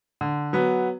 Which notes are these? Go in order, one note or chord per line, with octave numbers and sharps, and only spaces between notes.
D3
F#3 B3